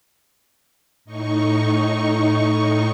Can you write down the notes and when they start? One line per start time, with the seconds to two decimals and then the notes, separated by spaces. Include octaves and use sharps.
1.05 A2 D#4 C#6